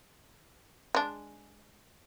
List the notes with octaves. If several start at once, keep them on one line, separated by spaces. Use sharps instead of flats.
G#3 D4